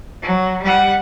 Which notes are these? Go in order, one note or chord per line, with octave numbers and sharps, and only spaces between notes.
F#3
G3 F#5